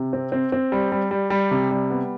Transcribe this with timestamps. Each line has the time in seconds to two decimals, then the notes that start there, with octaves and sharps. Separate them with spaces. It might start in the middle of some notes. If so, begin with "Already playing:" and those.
Already playing: C3
0.13 C4
0.32 C4
0.52 C4
0.72 G3
0.92 G3
1.11 G3
1.30 G3
1.51 C3
1.71 G3
1.90 B3